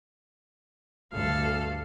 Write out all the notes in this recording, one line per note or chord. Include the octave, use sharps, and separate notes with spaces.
D2 G2 A4 F5